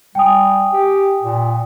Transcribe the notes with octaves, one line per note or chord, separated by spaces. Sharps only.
G3 G5 G#5 D#6
G4
A#2